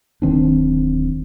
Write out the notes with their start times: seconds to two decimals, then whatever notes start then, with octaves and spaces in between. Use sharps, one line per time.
0.22 D1 D#3 C4 D4